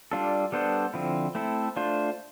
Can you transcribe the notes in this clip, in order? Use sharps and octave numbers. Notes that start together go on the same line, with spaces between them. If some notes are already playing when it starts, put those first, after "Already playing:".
G3 D4 F4 A4
G3 B3 D4 A4 C5
D3 F3 C4 E4
A3 C4 E4 A4
A3 D4 F4 C5